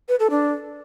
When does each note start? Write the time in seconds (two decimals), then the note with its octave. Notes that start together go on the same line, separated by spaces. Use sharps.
0.09 B4
0.20 A4
0.31 D4